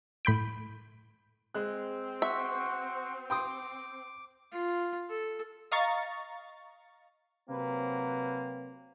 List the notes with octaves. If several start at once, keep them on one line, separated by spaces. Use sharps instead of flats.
A2 B5 G6 D7
G#3 C4 F#6
F#4 C5 E5 C#6
G5 C6 D6 D#6
F4
A4
D#5 F5 A#5 C#6 A6
C3 F#3 A#3 C4 B4